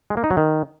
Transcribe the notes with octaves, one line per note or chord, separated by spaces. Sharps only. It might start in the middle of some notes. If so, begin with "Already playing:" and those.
G#3
A#3
D#4
F#3
D#3